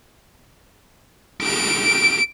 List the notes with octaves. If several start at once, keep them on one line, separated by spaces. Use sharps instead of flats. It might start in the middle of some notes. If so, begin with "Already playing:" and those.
D7